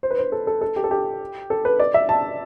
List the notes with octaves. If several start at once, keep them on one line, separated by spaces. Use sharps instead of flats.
C5
B4
C5
A4
A4
A4
G4
A4
G4
A4
B4
D5
E5
A5